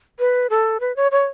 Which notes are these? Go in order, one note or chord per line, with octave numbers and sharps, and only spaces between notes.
B4
A4
B4
C#5
C#5